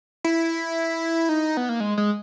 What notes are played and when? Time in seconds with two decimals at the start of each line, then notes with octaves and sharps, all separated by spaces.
0.24 E4
1.29 D#4
1.57 B3
1.69 A#3
1.80 G#3
1.98 G#3